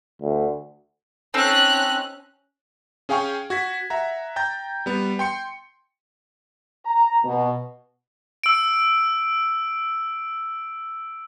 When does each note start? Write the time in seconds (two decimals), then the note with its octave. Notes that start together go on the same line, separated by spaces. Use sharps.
0.22 D2
1.34 C4 C#4 D#4 A4 F#6
3.09 C#4 G#4 F5 G5 G#5 C#6
3.50 F#4 G#6 B6
3.90 E5 F#5 A#5
4.36 G5 A#5 G6 A6
4.86 G3 B3
5.19 G5 C6 C#7
6.85 A#5
7.24 B2
8.44 E6 D7